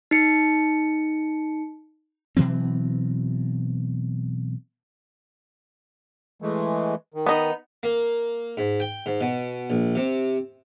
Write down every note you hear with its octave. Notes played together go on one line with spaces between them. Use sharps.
D#4 C#7
B2 E3 F#3 C4
E3 G#3 A3
D#3
B3 D#4
A#3
G#2
G5
G#2
B2
A#1
C3